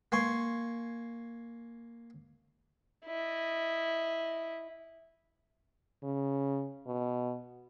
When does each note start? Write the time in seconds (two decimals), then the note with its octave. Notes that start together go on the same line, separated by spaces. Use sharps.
0.12 A#3 G#5 C6 C#6
3.06 E4 D#5
6.03 C#3
6.87 B2